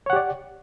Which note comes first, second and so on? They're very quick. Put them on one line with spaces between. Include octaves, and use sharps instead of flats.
C#5 F#5 G4 D5